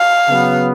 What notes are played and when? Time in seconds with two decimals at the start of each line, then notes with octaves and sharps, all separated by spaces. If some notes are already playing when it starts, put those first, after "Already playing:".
Already playing: F5
0.27 C#3 F#3 B3